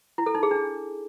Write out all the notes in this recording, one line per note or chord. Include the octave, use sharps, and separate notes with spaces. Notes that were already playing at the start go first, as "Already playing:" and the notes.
E4
A4
D#4
G#4
D4